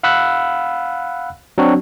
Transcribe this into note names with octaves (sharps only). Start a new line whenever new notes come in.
F5 F#5 B5 E6 F#6
F#3 C4 D4 F#4